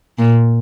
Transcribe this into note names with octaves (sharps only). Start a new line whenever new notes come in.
A#2